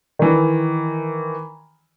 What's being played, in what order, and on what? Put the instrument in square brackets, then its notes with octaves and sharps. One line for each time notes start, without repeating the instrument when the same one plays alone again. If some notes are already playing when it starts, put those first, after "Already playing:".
[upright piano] D#3 E3